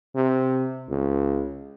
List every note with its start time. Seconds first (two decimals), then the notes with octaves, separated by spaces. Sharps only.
0.15 C3
0.90 C#2